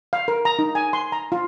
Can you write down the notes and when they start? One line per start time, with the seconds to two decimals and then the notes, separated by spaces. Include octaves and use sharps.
0.13 F5
0.28 A#4
0.45 A#5
0.59 D#4
0.75 G#5
0.93 C6
1.12 A#5
1.32 F4